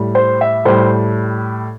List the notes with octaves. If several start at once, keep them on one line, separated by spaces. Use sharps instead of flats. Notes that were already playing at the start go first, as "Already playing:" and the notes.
Already playing: A2 G3
C5
E5
A2 G3 C5